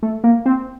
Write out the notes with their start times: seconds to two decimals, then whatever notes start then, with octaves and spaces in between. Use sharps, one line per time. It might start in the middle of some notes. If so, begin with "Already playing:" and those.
0.03 A3
0.24 A#3
0.46 C4